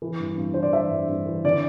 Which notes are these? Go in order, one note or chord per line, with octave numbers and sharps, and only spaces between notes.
E3
G2
G2
E3 C5
D5
E3 E5
G2
G2
E3
D3 D5